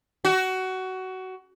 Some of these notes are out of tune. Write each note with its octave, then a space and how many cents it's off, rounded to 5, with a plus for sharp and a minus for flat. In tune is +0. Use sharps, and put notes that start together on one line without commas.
F#4 +20